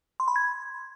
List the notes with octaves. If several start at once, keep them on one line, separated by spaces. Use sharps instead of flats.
C6
B5
G#6